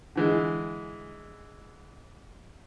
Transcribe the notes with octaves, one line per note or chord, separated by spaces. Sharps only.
D3 E3 G#3